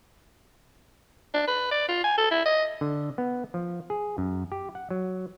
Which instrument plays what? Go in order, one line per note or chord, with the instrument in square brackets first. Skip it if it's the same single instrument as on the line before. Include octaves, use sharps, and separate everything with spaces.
[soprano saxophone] D4
B4
D5
F4
G#5
A4
E4
D#5
[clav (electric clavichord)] D3
B3
F3
G#4
F#2
G4
F#5
F#3